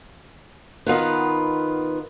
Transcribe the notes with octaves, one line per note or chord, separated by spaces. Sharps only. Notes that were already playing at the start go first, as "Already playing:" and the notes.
D#3 B3 F4 B4